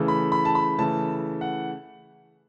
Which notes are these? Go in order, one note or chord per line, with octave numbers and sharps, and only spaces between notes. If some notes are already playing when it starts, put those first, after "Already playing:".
Already playing: C#3 E3 A3
B5
B5
A5
B5
C#3 E3 A3 A5
F#5